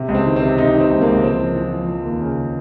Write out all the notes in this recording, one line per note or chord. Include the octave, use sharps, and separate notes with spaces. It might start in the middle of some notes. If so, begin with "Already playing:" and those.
Already playing: C3
C#2
C4
D#3
C4
C3
C3 D#4
D#3
C4
C#2
A#3
C#2
F3 C4
F3
F3
F3
F3
D#2
C#3